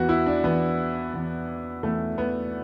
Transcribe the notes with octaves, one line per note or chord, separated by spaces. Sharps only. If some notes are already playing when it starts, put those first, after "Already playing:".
Already playing: E2 E3 B3 F#4
E4
D4
E2 E3 B3
E2 E3
E2 E3 A3
B3